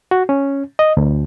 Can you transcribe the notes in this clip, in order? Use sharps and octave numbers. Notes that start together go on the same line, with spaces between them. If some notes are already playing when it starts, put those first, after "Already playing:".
F#4
C#4
D#5
D2